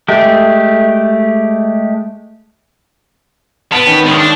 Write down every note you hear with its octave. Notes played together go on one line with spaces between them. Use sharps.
G#3 A3 G4
B3 A5 D7
D#3 C#4
G2 G#3
D4